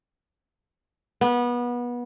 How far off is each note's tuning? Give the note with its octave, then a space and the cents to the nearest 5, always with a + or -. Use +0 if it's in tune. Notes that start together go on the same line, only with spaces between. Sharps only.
B3 -25